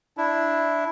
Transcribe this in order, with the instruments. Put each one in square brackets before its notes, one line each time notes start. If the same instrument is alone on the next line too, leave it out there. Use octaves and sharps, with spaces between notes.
[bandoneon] D4 E4